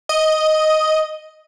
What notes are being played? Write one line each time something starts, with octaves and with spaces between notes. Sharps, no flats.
D#5